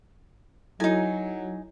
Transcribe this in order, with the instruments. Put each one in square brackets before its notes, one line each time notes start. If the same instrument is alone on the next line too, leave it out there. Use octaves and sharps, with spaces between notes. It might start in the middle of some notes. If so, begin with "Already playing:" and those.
[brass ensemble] F#3 [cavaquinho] D#4 G#5 [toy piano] E4 A4 E5